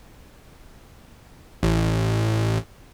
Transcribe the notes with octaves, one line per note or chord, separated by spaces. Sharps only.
A1